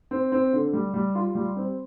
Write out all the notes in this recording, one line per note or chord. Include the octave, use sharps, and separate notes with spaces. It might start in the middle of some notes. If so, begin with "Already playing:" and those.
C4
C4
D3
G3
G3
F4
G3
C4